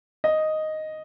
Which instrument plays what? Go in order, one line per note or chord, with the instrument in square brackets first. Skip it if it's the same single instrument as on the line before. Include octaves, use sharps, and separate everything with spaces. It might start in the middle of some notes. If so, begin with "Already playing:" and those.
[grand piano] D#5